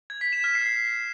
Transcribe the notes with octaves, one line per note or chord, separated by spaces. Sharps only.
G#6
B6
E7
F6
C7